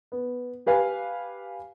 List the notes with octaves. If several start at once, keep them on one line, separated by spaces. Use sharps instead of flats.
B3
G4 B4 F5 G#5